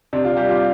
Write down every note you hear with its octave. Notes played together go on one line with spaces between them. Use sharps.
C3 D4
F4
G3 G4
F4